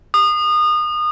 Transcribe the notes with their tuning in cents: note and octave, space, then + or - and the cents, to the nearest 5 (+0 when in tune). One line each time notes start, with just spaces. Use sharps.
D#6 -30